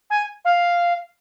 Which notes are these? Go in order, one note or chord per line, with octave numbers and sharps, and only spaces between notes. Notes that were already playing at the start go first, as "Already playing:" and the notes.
G#5
F5